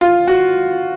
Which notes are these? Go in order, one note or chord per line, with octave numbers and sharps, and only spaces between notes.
F4
F#4